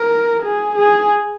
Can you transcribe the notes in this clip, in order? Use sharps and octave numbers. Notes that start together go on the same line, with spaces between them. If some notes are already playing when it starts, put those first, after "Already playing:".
Already playing: A#4
G#4
G#4